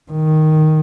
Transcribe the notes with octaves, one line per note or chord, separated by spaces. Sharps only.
D#3